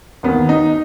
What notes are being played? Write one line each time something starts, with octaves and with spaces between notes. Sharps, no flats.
D#2 D#3 B3
D#4